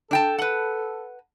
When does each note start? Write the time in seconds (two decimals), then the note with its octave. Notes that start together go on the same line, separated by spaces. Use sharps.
0.11 D4 A4 G5 A5
0.38 B4 F#5